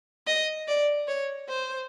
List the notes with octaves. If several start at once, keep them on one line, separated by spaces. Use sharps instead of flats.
D#5
D5
C#5
C5